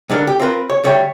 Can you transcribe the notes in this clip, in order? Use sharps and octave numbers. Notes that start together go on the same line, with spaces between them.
G2 D3 D4 A#4
G4
C4 F4 A#4 B4
C#5
D2 G3 C#5 E5 G5